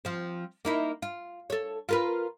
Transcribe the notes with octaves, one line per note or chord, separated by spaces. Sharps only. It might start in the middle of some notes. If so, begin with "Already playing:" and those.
F3 C4
A#3 D#4 E4
F4
A4 C#5
F4 A#4 B4